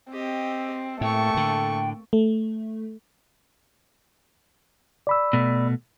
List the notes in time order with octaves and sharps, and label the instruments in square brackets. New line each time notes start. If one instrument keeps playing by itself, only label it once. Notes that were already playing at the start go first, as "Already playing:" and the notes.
[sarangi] C4 [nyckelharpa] G4 D#5
[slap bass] A2 [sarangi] A3 [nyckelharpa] A#3 C#6 [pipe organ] G5
[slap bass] A2 D3
[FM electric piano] A3
[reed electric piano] D5 B5 E6
[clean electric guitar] B2 A3